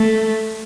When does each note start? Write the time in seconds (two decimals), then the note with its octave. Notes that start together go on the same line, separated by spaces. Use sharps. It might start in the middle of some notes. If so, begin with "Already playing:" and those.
Already playing: A3